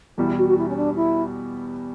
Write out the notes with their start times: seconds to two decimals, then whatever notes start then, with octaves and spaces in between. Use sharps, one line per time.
0.18 E2 B2 G3 E4
0.37 F#4
0.48 F#4
0.57 E4
0.68 C#4
0.76 D4
0.95 E4